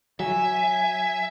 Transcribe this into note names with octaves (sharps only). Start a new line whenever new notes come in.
F#3 E5 G#5